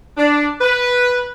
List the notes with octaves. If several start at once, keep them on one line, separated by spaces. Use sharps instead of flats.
D4
B4